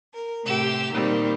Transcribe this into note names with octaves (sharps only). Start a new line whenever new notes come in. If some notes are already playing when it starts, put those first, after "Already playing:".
A#4
A2 C3 G4 E6
A#2 D#3 G3 A#3 C4